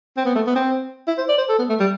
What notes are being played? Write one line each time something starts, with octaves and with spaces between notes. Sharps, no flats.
C4
B3
A3
B3
C4
E4
C5
D5
C5
A4
B3
A3
G3